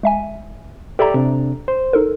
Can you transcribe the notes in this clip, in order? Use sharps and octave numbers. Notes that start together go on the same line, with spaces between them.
G#3 E5 G#5
G4 A4 D5 E5 A#5
C3 D4
C5
D#4 A4 A#4